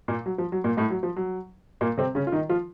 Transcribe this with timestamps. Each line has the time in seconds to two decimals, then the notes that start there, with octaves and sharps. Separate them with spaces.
0.08 A#2 A#3
0.26 F#3
0.38 F3
0.52 F#3
0.64 A#2 A#3
0.77 A2 A3
0.90 F#3
1.03 F3
1.16 F#3
1.81 A#2 A#3
1.98 C3 C4
2.15 C#3 C#4
2.27 F4
2.32 D#3 D#4
2.49 F3 F4